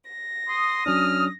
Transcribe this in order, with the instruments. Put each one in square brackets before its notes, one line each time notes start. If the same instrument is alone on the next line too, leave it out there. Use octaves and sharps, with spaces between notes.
[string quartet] A#6
[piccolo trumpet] C6 [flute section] D#6
[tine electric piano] F#3 C#4 D4 [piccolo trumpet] F6